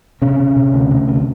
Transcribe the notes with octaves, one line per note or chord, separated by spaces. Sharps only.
C3 C#4
C3
C3
D2
C3
D2